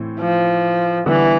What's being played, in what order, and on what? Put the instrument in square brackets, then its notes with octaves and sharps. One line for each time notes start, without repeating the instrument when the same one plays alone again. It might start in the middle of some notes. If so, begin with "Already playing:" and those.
Already playing: [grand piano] A2 E3 C4
[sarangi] F3
[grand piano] D3 G3 B3 [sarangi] E3